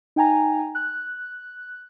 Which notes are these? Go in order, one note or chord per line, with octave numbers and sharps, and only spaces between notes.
D#4 G5 G#5 A#5
F#6